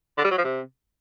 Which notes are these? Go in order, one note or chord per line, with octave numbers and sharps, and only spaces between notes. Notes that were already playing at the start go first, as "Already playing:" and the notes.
D3
G3
F#3
F3
C3